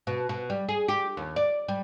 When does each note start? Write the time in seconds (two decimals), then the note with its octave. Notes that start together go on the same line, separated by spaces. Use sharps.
0.07 B2
0.29 B2
0.50 G3
0.69 G#4
0.88 G4
1.17 D#2
1.36 D5
1.68 G3